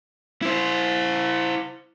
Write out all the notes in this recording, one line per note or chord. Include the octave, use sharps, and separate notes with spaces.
E4 C5